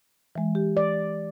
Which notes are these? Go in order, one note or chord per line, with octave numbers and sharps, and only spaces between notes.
E3 G#3
G4
D5